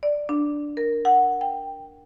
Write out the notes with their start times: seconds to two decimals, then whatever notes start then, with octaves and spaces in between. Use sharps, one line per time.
0.03 D5
0.29 D4
0.77 A#4
1.05 F#5
1.41 G5